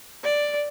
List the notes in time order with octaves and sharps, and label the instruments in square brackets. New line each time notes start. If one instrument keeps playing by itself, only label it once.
[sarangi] D5